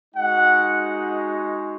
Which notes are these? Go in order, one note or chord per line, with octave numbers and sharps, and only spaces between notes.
G#3 D#4 F#4 F#5